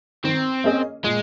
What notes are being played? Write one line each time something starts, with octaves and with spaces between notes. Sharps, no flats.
D#3 C4
A#3 C#4 G#4 D#5
A#2 G#3